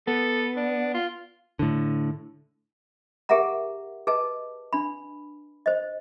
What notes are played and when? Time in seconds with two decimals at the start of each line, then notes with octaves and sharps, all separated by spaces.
0.07 B3 A4
0.57 D4
0.94 F4
1.59 A2 D3
3.29 G4 G#4 A#4 E5 F#5 A#5
4.07 G#4 B4 D#5 A5
4.73 D4 B5
5.66 C5 D#5